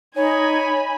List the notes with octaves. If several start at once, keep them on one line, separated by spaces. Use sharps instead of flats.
D#4 C#5 G#5 B5